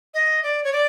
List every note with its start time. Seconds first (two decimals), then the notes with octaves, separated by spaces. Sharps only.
0.14 D#5
0.43 D5
0.64 C#5
0.73 D5